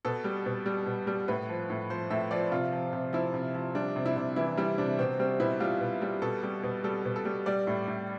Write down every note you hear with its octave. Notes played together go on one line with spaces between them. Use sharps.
B2 A4
G3
B2
G3
B2
G3
A2 B4
F3
A2
F3 C5
A2 E5
F3 D5
C3 F4
F3
C3
F3 E4
C3
F3
G3 D4
C3
E4
C3
E3 E4
G3 E4
C3 D4
B2 C4
G3 C4
B2 E4
G3 F4
B2
G3
B2 A4
G3
B2
G3 A4
B2
A4
G3
G3 D5
A2
A2